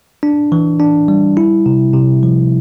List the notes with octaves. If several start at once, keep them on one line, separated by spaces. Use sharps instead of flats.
D4
E3
D4
G3
E4
C3
C3
F3